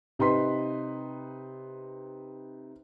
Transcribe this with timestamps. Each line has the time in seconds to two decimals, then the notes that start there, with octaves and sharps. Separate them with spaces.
0.19 C3 D#4 B4 C6 B6